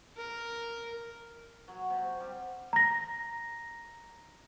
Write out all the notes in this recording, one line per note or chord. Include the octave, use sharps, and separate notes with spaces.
A#4
F#3
C3
G3
A#5 A#6